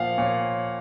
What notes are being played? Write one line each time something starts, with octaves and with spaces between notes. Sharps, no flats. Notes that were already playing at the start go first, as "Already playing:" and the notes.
Already playing: A#2 F3 F5 F#5
A#2 C#5